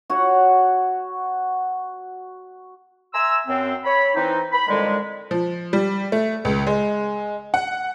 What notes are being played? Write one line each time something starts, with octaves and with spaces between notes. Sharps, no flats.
F#4 C#5 F#5
E5 G#5 A#5 C6 E6
F#2 C4
C#5 B5
E3 C4 D#4
B5
F2 A2 D3 D#3 G3 G#3
F3
G3
A3
C#2
G#3
F#5